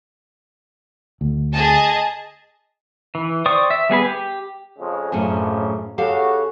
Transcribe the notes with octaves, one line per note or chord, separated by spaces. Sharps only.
D2
G#4 D#5 A5
E3
C5 D5 G5 C#6 D#6
E5
G3 B3 G#4 B4
G4
F2 C#3 G#3
A#1 F#2 A2 C#3 C#4
C#3 F#4 G4 A4 F5